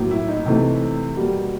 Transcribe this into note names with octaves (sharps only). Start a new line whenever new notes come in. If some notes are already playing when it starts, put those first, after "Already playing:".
Already playing: A2 F#3 A#3
E4
D#4
C3 E3 A3
B2 G3 A#3